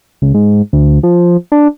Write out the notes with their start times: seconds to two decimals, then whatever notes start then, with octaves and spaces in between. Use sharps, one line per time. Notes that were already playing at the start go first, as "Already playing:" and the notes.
0.22 C#2
0.34 G#2
0.73 D2
1.03 F3
1.52 D4